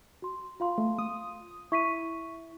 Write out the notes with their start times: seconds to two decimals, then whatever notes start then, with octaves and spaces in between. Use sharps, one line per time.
0.22 F#4 C6
0.60 F4 F5 C6
0.78 A3
0.99 D#6
1.72 E4 C#6 B6 D#7